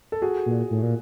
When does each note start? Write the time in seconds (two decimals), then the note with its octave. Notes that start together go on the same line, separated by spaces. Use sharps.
0.12 A4
0.22 F#4 G#4
0.46 A#2
0.70 A2
0.83 A#2